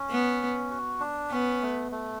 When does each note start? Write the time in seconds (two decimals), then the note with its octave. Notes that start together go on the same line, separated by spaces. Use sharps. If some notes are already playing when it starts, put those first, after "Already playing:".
Already playing: C#4
0.10 B3
0.71 F#4
1.00 D4
1.31 B3 C#4
1.62 A3
1.92 A3